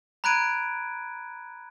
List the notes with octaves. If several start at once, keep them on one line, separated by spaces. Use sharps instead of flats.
A#5 B5 F#6 G#6 D7 D#7